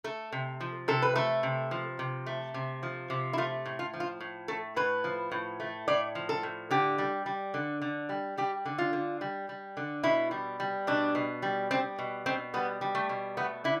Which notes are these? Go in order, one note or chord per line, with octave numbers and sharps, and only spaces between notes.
A3 A4
C3
F3
C3 A4
B4
A3 A4
C3
F3
C3
A3
C3
F3
C3
E4
A3 F4
A2
F4
F3
F4
A2
A3 A4
A2 B4
F3
A2
A3
A2 D5
F3
A4
A2
D3 G4
G3
G3
D3
D3
G3
G3 G4
D3
F4
D3
G3
G3
D3
B2 E4
G3
G3
B2 D4
B2
G3
G3 C4
B2
B2 C4
G3 B3
G3
A3
B2
A3 B3
D3 E4